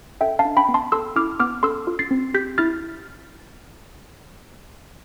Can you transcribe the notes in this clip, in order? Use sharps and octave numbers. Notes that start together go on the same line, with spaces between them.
A4 E5 G5
F5 A5
D4
G5 B5
B3
A5 C6
A4 C6 E6
E4 D6 F6
B3 D6 F6
A4 C6 E6
F4
A6 C7
C4
G4 G6 B6
E4 F6 A6